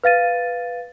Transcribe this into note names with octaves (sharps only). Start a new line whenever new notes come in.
B4 F5 A6 D#7